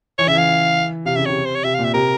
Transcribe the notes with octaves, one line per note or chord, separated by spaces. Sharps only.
E3 C#5
C#3 E5
E3 F5
C3 F5
C#3 E5
C3 C#5
C5
C#5
C3 E5
F5
A#2
E5
C3 A#4